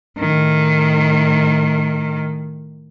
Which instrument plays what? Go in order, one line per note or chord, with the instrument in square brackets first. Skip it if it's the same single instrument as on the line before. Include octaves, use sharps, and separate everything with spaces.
[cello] A2 D#3